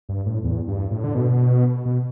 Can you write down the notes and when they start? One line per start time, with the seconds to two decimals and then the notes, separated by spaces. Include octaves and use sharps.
0.09 G2
0.26 A2
0.44 E2
0.68 G2
0.91 A2
1.04 D3
1.15 B2
1.85 B2